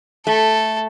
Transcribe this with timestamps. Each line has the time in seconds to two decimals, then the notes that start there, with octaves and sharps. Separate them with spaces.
0.26 A3 A4